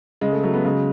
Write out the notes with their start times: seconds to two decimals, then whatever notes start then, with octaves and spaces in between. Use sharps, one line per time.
0.21 C#3 G#3
0.32 A3
0.43 F#3 A3
0.54 B3
0.65 C#3 G#3